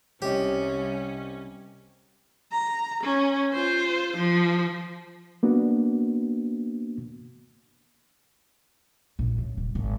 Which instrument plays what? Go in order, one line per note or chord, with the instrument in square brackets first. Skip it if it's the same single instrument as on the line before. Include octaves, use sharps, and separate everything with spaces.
[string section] C2 [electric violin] C#4 [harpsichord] G4 [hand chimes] C#5 D#5
[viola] A#5
C#4
F4 C5
F3
[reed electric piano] A#3 B3 D4 F#4
[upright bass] A#1
C#3
D#1
G#1